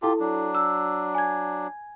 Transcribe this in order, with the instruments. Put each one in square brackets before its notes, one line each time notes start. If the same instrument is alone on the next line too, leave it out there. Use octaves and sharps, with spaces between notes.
[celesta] E4 A4 A5 [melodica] F4 G4
[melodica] F#3 D4
[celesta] E6
G#5 G#6